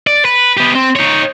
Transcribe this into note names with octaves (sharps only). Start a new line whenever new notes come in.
D5
B4
B3 G4
C4
D#4 C#5